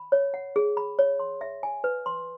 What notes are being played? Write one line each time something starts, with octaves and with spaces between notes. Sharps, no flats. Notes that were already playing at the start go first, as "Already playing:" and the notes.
Already playing: B5
C#5
F#5
G#4
B5
C#5
C6
E5
G#5
B4
C6